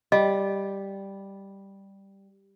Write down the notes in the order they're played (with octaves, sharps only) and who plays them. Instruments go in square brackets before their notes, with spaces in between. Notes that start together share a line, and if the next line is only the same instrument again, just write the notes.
[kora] G3 [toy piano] D#5